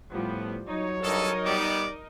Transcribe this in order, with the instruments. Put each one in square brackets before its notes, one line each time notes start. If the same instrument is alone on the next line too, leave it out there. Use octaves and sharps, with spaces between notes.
[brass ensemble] A2 B3 [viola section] F3 G3
[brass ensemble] F#3 C#5 [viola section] D#4
[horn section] G2 A4 [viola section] D#4 A#4 D#5
[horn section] G3 B3 [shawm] D5